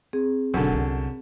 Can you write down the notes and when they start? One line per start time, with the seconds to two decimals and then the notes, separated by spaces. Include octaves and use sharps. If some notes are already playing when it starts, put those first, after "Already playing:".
0.13 C4 G#4
0.54 E1 F#2 D3
0.72 C2